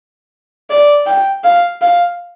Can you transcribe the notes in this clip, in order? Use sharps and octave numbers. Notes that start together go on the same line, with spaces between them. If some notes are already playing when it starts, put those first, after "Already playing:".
D5
G5
F5
F5